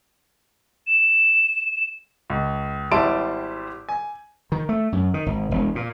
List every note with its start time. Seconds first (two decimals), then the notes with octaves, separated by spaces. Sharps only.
0.87 E7
2.30 C#2
2.91 G#1 G3 E4 A5 C6 D7
3.89 G#5
4.52 D#3
4.69 A3
4.92 F#2
5.14 D#3
5.26 G#1
5.51 E1
5.75 A#2